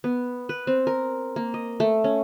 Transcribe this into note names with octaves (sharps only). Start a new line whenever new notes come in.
B3
B4
C4
A#4
A#3
D#5
A3
C#4